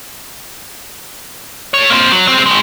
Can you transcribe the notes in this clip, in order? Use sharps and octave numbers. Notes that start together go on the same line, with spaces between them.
A3 C#5
A#3 C4
F#3
G#3 C4
D#3 G#3